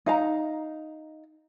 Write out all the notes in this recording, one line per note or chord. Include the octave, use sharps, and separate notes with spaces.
D#4 F5 A#5